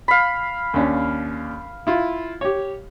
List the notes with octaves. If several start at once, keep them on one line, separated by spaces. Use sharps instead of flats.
F5 B5
D#2 C#4 D4
E4 F4
G4 C#5